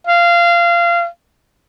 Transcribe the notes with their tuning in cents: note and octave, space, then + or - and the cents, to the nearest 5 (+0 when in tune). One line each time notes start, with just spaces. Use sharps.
F5 -20